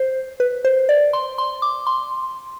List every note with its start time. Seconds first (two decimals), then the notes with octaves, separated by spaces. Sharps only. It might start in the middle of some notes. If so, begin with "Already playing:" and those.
Already playing: C5
0.40 B4
0.65 C5
0.89 D5
1.13 C6
1.38 C6
1.62 D6
1.87 C6